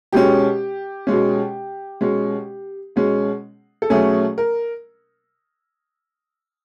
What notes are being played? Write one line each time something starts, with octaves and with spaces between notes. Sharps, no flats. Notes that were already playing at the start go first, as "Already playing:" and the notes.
B2 G#3 C#4 G4
B2 G#3 C#4
B2 G#3 C#4
B2 G#3 C#4
A4
B2 F#3 A3 C#4 G#4
A#4